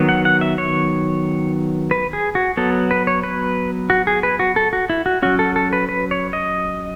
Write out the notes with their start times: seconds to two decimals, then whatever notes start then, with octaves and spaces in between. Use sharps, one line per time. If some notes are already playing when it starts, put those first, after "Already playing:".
Already playing: D#3 F#3 B3
0.09 F#5
0.25 F#5
0.41 E5
0.58 C#5
1.91 B4
2.13 G#4
2.35 F#4
2.57 F#3 B3 A4
2.91 B4
3.07 C#5
3.23 B4
3.90 F#4
4.07 G#4
4.23 B4
4.39 F#4
4.56 A4
4.73 F#4
4.90 E4
5.06 F#4
5.22 F#3 C#4 F#4
5.39 A4
5.56 A4
5.73 B4
5.89 B4
6.11 C#5
6.33 D#5